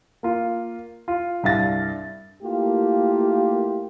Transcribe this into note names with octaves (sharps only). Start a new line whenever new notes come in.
A#3 F4
F4
C2 G2 E5 F5 A6 A#6
A3 A#3 E4 F4 G4